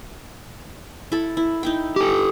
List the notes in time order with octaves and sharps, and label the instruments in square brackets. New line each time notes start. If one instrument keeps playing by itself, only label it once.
[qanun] E4 A4
E4
D#4 E4 G5
[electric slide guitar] G4 A4